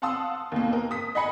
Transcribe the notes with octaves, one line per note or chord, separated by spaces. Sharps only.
F5 F#5 A5 C6 D#6 E6
D#2 B2 A#3
A#4
D#6 B6
D#5 F#5 G#5 B5 C#7